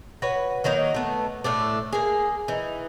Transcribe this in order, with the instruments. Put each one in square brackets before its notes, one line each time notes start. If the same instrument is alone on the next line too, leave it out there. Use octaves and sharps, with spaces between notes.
[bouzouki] F#4 B4 C#5
D#3 F#3 A#3 D#4
A3 B3
A2 A3 D4
A#3 G#4
E3 D#4